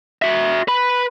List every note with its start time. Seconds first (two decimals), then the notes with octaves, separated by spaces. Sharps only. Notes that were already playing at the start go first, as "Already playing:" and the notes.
0.22 F#4 E5
0.68 B4 B5